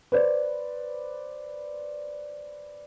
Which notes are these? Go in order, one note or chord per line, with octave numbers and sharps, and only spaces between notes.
B4 C5 D5